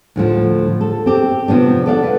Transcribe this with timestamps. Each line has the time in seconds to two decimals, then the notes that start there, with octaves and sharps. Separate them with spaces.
0.16 D2 A2 F3
0.81 A4
1.06 C4 G4
1.48 C3 F3 B3 D4
1.86 A4 D5 F5 F#5
2.03 B4 F5